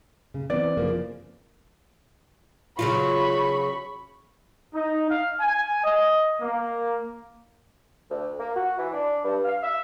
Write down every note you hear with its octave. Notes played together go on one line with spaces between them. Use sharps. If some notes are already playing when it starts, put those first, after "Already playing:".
C#3
E3 B3 C4 D5
C#3 F3 A#3
C#3 F#3 F4 B5 C#6
D#4
F5
G#5
D#5
A#3
D2
A#3
F#4
E3
D4
G2
F5
E5